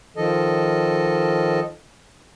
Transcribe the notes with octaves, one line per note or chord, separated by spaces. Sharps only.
D#3 F3 A4 D#5